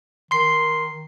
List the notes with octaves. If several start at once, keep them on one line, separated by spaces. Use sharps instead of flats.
D#3 C6 C7